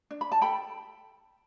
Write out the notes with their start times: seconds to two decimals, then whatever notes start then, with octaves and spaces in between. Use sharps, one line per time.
0.11 D4
0.21 B5
0.32 A5
0.41 A4 G5 B5